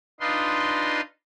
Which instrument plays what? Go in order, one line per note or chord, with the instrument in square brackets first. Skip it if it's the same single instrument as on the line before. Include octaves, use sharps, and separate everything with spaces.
[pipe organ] D4 D#4 F4 B4 D#5 C6